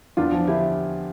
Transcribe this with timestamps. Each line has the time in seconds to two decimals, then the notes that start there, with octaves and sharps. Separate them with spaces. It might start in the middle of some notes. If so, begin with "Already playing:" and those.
0.17 E2 D4 F4
0.32 F3
0.47 D3 E4 G4